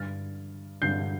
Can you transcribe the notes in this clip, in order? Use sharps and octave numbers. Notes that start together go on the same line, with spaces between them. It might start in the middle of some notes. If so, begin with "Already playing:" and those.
Already playing: G2 D3 F6 A6
G2 D3 G6 C7